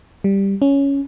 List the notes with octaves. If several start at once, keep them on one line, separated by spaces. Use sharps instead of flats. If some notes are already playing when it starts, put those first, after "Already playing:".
G3
C#4